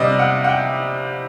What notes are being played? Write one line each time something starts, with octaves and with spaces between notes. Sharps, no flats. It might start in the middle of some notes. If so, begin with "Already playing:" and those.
Already playing: C3 G3 D4 D5 D#5
F#5
F#5
G5